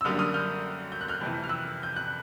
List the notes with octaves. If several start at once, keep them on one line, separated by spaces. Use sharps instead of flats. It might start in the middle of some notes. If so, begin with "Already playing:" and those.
E6
F#2 D3 G3 A#3 D#6 F6
D#6 F6
F6 G6
G6
F#6
F6 G6
F2 C3 E3
F6
E6 F#6
G6
F#6